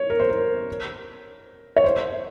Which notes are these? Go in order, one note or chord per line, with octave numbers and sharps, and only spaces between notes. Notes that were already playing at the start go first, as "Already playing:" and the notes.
Already playing: C#5
A#4
C5
A#4
C#5
C5